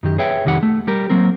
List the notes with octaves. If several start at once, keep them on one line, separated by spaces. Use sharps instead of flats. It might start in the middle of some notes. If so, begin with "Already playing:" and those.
F#2 D#3 G4
G#4 B4 C#5 E5 G5
C2 F2 D#3 G4 F#5
A3
G3 G4 A#4
F#3 A#3 C4 A#4